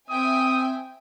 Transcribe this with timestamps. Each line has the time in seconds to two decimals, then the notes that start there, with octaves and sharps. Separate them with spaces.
0.10 C4 E5 G5 G#5 D#6